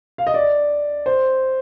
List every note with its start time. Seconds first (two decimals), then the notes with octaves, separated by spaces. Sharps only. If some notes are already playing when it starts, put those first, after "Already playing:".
0.18 F5
0.27 D#5
0.34 D5
1.06 C5